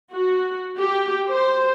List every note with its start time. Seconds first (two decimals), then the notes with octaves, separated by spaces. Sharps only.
0.12 F#4
0.78 G4
1.30 C5